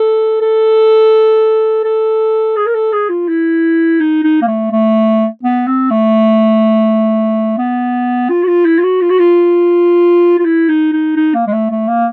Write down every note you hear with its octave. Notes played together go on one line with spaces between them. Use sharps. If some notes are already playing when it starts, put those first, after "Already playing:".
Already playing: A4
A4
A4
G#4
A#4
A4
G#4
F4
E4
D#4
D#4
A#3
A3
A3
B3
C4
A3
B3
F4
F#4
F4
E4
F4
F#4
F4
F#4
F4
F4
E4
D#4
D#4
D#4
A#3
G#3
A3
A3
A#3